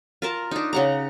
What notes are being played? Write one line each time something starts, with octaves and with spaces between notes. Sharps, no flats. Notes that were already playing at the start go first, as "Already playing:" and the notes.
F4 A#4 A5
D4 D#4
C#3 F#5 A#5